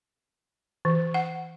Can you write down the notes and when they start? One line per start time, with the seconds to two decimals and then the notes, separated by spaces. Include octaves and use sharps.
0.85 E3
1.14 F#5